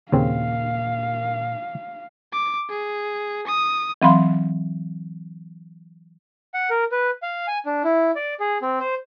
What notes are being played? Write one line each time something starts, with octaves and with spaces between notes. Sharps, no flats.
D#2 A#2 C#3 A#3 C4 F5
D6
G#4
D#6
E3 F#3 C4 F5 B5 C6
F#5
A#4
B4
F5
G#5
D4
E4
D5
G#4
C4
C5